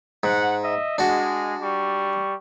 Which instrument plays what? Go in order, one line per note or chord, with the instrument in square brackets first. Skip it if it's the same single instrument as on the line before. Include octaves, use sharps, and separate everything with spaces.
[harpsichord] G#2 [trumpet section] F#5
[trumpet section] D#5 E5
[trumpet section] G#3 [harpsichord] D4 F#4
[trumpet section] G3 C#6